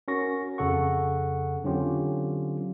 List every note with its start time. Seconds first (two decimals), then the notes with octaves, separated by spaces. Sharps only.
0.08 C#4 F#4 A#4 C#6 A#6
0.58 F2 C#3 A4 F#5 C#6
1.64 D3 F#3 C4 C#4 F4 G4